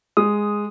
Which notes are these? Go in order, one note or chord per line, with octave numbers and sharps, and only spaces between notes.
G#3 D#6